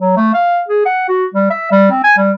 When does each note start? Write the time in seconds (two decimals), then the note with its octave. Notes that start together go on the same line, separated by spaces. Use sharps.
0.01 F#3
0.17 A3
0.34 F5
0.68 G#4
0.86 F#5
1.09 F#4
1.34 G3
1.50 E5
1.71 G3
1.91 C4
2.04 G#5
2.18 G3